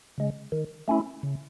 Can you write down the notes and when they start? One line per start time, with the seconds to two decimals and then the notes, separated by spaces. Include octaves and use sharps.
0.18 C#3 G#3
0.52 D#3
0.88 A3 C#4 E4
1.23 C#3